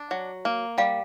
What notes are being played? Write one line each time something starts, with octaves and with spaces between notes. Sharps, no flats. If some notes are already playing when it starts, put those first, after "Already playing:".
Already playing: D4
F#3
A#3
G3 F5